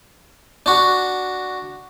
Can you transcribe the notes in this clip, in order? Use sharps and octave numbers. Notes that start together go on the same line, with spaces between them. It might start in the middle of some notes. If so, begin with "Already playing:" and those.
D4 F#4